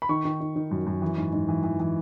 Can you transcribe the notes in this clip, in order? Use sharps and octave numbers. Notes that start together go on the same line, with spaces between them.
B5
D#3 C#6
D#3
D#3
D#3
F#2
F#2
E3
G#2
G#2
E3
E3
E3